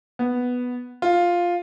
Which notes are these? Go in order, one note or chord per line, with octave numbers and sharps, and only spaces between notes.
B3
F4